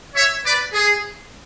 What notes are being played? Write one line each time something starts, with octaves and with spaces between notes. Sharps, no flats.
C#5 E5
B4 D5
G#4